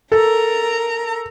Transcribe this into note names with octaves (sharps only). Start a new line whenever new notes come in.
A4 A#4 A#5